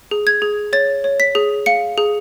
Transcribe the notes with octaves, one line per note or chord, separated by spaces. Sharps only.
G#4
G#6
G#4
C#5 A6
C#5
B6
G#4
F5 C#7
G#4